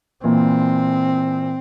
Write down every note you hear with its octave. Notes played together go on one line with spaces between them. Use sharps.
A#2 E3 C4